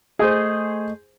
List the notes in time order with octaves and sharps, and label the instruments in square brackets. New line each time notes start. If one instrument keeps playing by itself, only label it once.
[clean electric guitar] A3 D#5 [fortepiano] G#4 C5